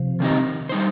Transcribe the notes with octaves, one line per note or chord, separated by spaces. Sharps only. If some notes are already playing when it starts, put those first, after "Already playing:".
Already playing: C3 F3
D#3 C4 D#4 G4 D#5
G3 D#4 C5